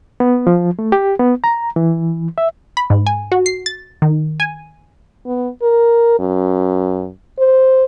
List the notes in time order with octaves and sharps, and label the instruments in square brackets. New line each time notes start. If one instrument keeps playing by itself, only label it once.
[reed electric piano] B3
F3
A3
G4
B3
A#5
E3
E5
[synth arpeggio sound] B5
G#2
G#5
F#4
C7
A6
D#3
G#5
[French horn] B3
A#4
F#2
C5